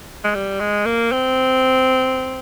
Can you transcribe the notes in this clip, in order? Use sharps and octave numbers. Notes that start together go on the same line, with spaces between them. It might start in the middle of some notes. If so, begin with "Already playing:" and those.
G#3
G3
G#3
A#3
C4